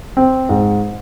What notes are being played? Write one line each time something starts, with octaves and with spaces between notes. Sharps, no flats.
C4
G#2